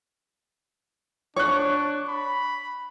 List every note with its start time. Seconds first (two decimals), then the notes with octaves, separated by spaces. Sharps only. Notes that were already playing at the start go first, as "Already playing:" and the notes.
1.36 D4 C#5 C#6 F#6
2.08 B5